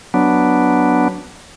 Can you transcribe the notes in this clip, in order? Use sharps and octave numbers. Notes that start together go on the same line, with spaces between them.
F#3 B3 D4